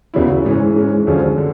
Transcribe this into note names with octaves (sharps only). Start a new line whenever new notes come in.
F#2 C#3 F#3 B3 E4
G#2 E3 G#3 C#4
G#2 E3 G#3 C#4
F#2 D3 F3 G#3 C#4
D3